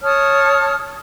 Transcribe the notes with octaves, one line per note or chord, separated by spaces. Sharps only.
C#5 A5 D#6 F6